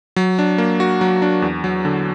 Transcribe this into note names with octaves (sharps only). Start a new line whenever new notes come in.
F#3
D4
A#3
F#4
F#3
D4
E2
F#3
D3